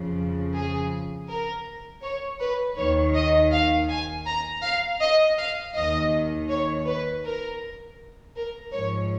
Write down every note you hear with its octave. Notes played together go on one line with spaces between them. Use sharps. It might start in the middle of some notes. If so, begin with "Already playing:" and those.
Already playing: F2 C#3 F3
G#4
A#4
C#5
B4
D#2 D#3 C#5
D#5
F5
G#5
A#5
F5
D#5
F5
D#2 D#3 D#5
C#5
B4
A#4
A#4
G#2 F3 C#5